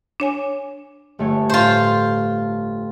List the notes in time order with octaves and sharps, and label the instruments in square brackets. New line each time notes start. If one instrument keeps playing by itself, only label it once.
[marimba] D4 C#5 G#5
[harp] G1 A3 C#5
[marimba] A2 [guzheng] F4 C5